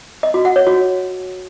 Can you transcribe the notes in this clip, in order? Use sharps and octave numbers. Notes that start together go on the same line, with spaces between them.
D#5
F#4
F#5
C#5
F#4